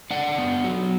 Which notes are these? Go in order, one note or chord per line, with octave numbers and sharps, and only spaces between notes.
D4 D5 F#5
B3
F#3